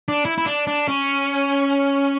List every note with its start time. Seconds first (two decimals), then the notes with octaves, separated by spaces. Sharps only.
0.08 D4
0.25 E4
0.38 E4
0.46 D4
0.67 D4
0.88 C#4